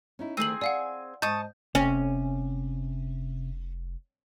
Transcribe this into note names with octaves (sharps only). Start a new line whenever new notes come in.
C#4 D#4 E4
D2 D#3 A3 C4 G#4 D#7 F#7
D5 F5 F#5 G#5
G#2 D#5 A5 C#6 D#6 G6
F1 C3 C#4